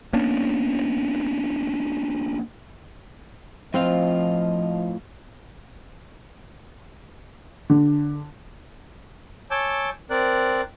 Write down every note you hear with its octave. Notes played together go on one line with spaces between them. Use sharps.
A#3 B3 C#4 D4
A2 F3 C4 F4 D#5 F5
D3
C#5 G#5 A5 D6 E6 G6
C4 A#4 D5 F#6